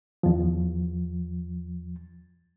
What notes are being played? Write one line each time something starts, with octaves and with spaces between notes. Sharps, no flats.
E2 F3